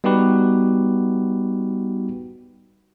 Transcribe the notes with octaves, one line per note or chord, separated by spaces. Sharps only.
G3 B3 D#4 F#4 G4 B4